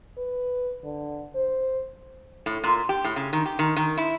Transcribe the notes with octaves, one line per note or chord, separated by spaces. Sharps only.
B4
D3
C5
A2
A#2
G4
A2
C#3
D#3
G4
D#3
D#3
E4